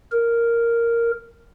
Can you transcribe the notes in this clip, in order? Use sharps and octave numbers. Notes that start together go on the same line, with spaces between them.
A#4